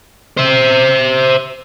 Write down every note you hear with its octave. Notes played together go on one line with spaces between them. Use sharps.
C5 E5